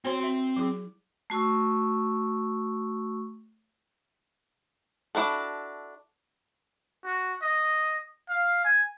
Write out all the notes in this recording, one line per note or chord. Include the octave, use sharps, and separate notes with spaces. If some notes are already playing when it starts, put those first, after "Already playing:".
C4 F#4 C5 C#5 C6
F#4 E5
F#3 E4 G#4
A3 F#4 C#6 E6
D4 E4 F#4 A4
F#4
D#5
F5
G#5